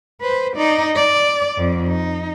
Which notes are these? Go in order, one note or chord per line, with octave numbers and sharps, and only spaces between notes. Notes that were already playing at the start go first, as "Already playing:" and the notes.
B4 C5
D#4 D5
D5
F2
D#4